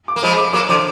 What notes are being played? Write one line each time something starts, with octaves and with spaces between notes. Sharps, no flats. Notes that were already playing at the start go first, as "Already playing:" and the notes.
D6
A#3
F3 G#3 B5
D6
F#3 A#3 D6
D3 F3 D6